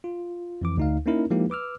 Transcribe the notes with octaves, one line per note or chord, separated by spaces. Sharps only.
F4
F2 E3 D6
D2 D#4 F5
A#3 C#4 D#4 E4 A#4
F3 G#3 A#3 D#4 E4 G4
B4 D6 E6 F6